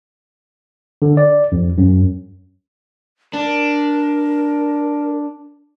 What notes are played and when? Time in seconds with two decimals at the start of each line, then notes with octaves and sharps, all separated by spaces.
1.02 D3
1.17 D5
1.52 F2
1.78 F#2
3.33 D4 A#4